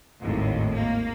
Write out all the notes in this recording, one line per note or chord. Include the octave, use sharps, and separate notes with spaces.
G#1 D#2 A2
A#3